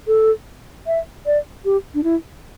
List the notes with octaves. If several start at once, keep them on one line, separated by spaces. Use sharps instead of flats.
A4
E5
D5
G4
D4
E4